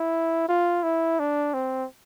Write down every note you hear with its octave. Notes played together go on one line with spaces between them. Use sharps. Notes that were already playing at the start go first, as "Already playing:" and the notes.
Already playing: E4
F4
E4
D4
C4